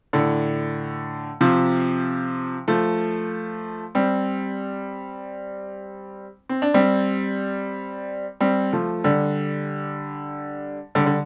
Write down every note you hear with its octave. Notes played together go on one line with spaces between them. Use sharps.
A2 D3
C3 F3
F3 A3
G3 C4
C4
D4
G3 C4
G3 C4
F3 A3
D3 G3
D3 G3
D3